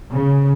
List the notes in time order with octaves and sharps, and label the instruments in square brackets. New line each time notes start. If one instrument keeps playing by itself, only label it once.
[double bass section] C#3